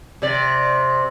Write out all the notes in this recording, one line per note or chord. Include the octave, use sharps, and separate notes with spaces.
C3 D5